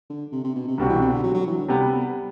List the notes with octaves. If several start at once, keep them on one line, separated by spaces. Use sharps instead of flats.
D3
C3
C3
B2
C3
C2 B2 D3 G3 C4 F#4
E3
C3
D3
F#3
F#3
E3
D3
C3 G3 B3